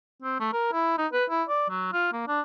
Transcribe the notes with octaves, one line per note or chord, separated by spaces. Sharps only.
C4
A3
A#4
E4
D#4
B4
E4
D5
F#3
F4
A#3
D4